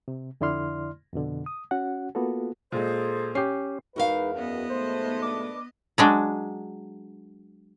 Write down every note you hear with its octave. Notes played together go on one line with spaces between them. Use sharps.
C3
F2 D3 E4 D5 C6 F6
F2 B2 D3
D#6
C#4 F#4 F#5
A#3 B3 F4 F#4 A4
A#2 G#3 G#4 A4 C5
C#4 G4 C7
E2 G#3 D#4 F#4 A#4 B4 F5
F#2 B3 D#5
B1 G#2 A3 C5
D4 B4 D6
F#3 G#3 D4